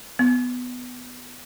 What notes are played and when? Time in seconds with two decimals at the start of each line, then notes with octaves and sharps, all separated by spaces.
0.19 B3